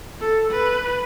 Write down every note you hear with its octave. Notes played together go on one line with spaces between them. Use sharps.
A4
B4